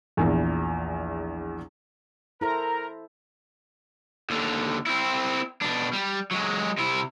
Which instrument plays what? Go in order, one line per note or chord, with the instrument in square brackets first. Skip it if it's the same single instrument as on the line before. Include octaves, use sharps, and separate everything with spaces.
[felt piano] A#1 E2
[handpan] E4 A4 C5 [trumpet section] A#4 [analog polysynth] A#5
[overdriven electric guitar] D#2 D3
C4 E4
B2 D4
G3
F#3 G#3
C3 E4